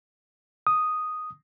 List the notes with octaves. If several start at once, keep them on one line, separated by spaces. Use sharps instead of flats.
D#6